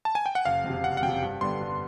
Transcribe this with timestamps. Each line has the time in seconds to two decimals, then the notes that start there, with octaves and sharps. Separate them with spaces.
0.05 A5
0.15 G#5
0.26 G5
0.35 F#5
0.45 F#1 F5
0.64 F2 C3
0.83 F#1 F#5
0.97 F#5
1.02 F2 C3 G5
1.22 G2
1.41 D3 G3 B3 C6
1.61 G2